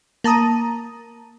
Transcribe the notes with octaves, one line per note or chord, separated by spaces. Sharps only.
A#3 A5 A#5 D#6 D#7